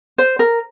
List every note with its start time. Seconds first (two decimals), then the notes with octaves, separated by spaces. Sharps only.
0.18 C5
0.39 A#4